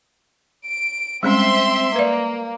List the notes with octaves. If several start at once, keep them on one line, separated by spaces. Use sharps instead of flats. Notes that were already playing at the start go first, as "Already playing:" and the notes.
D7
G3 G#3 C4 C#4 E5 C6
A#3 B4 D5